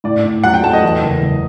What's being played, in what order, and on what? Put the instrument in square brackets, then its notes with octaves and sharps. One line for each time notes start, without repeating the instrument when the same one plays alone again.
[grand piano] A2 [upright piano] D5
[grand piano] A2
[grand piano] F#3 [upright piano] F#5
[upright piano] G5
[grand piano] A3 [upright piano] A5
[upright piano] D#5
[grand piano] E2
F#1
F#1